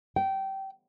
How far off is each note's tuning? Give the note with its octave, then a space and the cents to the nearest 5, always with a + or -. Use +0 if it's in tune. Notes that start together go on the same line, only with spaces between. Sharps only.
G5 -20